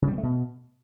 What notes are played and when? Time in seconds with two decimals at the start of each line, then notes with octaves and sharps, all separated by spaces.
0.02 C#3
0.07 G3
0.13 C4
0.18 A3
0.23 B2